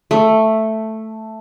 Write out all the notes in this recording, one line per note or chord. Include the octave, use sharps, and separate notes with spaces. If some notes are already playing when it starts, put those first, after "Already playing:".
A3